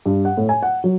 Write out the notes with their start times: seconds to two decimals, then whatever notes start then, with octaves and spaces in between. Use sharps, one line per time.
0.06 G2
0.25 F#5
0.37 A2
0.49 G#5
0.63 F#5
0.84 F#3